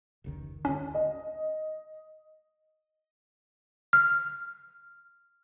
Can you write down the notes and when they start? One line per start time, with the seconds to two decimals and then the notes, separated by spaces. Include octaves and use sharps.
0.24 F1 C#2 D#3
0.65 G1 D#2 D3 C#4
0.94 D#5
3.93 F6